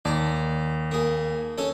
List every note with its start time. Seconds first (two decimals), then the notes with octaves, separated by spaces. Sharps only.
0.05 D#2 D5 A5 A#5
0.91 A#3 G#4
1.58 C#4 A4 C#5